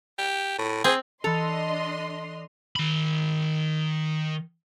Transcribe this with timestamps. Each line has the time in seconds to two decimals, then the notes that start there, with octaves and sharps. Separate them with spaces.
0.18 G4
0.58 A2
0.84 C4 G#4
1.24 E3 D4 A4 D#5 C6 F7
2.76 D#3 B5